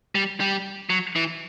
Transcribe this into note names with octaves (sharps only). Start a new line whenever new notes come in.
G3
G3
F#3
E3